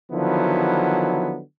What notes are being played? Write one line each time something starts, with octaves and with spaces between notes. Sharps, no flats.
D3 D#3 F3 F#3 B3 E4